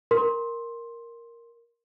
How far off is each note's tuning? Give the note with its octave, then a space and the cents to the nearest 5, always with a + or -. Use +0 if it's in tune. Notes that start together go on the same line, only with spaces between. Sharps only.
A#4 +0 C6 +10